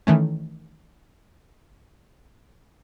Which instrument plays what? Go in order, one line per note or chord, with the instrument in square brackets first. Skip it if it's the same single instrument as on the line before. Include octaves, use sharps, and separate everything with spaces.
[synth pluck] D#3 E3 A3 C#4